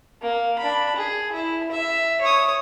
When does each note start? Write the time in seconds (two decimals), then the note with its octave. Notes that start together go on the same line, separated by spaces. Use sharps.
0.22 A#3
0.58 D4 B5
0.96 G#4
1.32 E4
1.72 E5
2.21 C#5 D#6